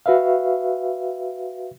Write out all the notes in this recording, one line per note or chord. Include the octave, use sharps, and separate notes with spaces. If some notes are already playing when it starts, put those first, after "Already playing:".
F#4 B4 E5 F5